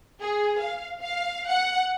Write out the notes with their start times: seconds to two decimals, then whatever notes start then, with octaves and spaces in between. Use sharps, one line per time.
0.20 G#4
0.59 F5
1.00 F5
1.48 F#5